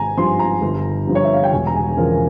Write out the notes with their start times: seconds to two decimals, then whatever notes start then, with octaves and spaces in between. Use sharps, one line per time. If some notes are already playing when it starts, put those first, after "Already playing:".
Already playing: G#1 G#5 A#5
0.17 G2 F3 C6
0.39 A#5
0.62 G1
1.07 G2 F3
1.15 C#5
1.24 E5
1.34 F5
1.44 G5
1.52 E1 G#5
1.67 A#5
1.76 G#5
1.97 E2 C#3 F3 A#4